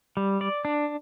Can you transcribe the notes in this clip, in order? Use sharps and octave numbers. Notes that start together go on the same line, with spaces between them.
G3
D5
D4